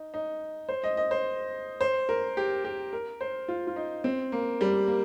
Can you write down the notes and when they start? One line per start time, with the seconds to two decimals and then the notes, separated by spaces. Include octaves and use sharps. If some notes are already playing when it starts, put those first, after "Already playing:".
Already playing: D#4
0.14 D#4
0.69 C5
0.83 D#5
0.97 D#5
1.11 C5
1.81 C5
2.09 A#4
2.37 G4
2.64 G4
2.93 A#4
3.21 C5
3.48 F4
3.67 F4
3.76 D#4
4.04 C4
4.32 A#3
4.61 G3
4.87 A#3